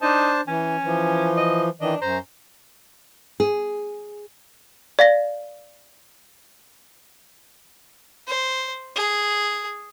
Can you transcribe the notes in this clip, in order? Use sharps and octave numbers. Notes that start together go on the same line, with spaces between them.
D4 D#4 C5 A5
E3 C#4
E3 F3
D#5
D#3 E3 D4 D#5
F#2 C5 A#5
G#4
D5 F5 A#6
C5
G#4